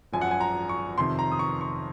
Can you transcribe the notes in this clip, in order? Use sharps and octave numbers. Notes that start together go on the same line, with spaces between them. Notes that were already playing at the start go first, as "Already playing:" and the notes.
G#1 F#2 F3 G#5
F#5
G#5
A#5
C#6
F2 C3 D#3 C6
A#5
D#6
C#6
C#6